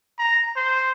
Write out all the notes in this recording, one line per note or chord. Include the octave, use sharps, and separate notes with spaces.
A#5
C5